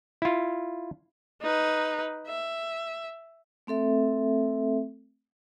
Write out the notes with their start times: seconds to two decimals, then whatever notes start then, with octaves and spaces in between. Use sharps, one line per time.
0.22 E4 F4
1.42 D#4 B4
2.28 E5
3.67 A3 C4 A4 E5